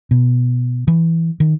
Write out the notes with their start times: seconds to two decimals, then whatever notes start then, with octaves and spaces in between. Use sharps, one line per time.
0.11 B2
0.88 E3
1.40 D#3